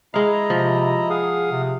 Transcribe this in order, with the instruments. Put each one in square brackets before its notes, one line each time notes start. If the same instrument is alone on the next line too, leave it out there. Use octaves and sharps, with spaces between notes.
[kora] G#3 F5 [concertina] E4 D#5 A#5
[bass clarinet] C3 [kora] F3
[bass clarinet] G#4 [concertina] F5 F#5 D#6
[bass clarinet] C3